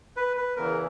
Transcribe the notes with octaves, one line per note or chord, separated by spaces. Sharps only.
B4
B4
E2 C#3 E3 A#4